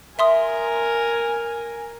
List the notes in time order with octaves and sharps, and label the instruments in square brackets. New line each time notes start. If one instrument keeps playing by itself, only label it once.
[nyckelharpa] A#4 [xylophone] E5 C6 D#6 [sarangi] G#5